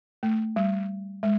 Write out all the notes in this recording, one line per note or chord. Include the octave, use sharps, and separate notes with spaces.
A3
G3
G#3